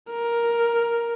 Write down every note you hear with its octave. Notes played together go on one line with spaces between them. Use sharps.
A#4